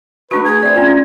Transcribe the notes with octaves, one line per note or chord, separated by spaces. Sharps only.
A3 D4 F#4 B4 C#6
G#4 G#6
C4 D5 E5
C#4 F4 G#5
C#4